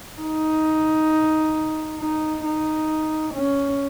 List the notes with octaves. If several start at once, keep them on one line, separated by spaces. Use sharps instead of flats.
D#4
D#4
D#4
C#4